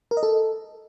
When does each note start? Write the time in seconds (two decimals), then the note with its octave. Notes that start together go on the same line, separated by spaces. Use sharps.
0.11 A#4
0.17 D#5
0.23 A4